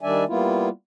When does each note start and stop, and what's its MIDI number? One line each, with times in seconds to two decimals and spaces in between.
0.01 0.24 51
0.01 0.24 55
0.01 0.24 62
0.01 0.24 74
0.01 0.24 76
0.01 0.24 80
0.28 0.69 55
0.28 0.69 58
0.28 0.69 59
0.28 0.69 64
0.28 0.69 65